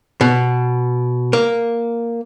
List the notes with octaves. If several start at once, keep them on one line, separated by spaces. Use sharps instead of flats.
B2
A#3